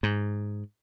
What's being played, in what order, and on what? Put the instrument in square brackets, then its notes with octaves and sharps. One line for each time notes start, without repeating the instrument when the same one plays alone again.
[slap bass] G#2